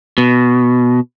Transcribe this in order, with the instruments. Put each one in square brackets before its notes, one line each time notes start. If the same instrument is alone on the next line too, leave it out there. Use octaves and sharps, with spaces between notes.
[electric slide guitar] B2